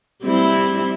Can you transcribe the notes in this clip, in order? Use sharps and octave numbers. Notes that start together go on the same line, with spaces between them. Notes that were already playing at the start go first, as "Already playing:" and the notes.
G3 C4 E4